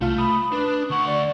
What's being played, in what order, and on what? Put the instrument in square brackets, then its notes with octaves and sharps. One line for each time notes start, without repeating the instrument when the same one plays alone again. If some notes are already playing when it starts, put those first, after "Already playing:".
[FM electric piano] C2 F4 F5 [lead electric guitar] A3
[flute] B5 [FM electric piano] D#6
[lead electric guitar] D4 [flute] B4
[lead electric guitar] D2 F#5 [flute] C#6
[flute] D5